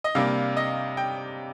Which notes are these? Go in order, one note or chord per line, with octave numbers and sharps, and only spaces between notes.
D#5
C3 G3 A#3 D4 F5
D#5
G5